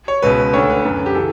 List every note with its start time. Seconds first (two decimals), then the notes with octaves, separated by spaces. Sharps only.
0.08 C#5
0.22 C#2 B2 B4
0.53 D2 D3 C#5
0.70 B4
0.85 F#2 D3
1.06 G4
1.15 C#3 E3 A4